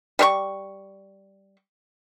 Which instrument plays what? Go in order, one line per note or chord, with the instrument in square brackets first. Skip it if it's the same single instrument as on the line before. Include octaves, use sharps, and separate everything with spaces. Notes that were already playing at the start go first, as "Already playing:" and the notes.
[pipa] G3 A#4 C#6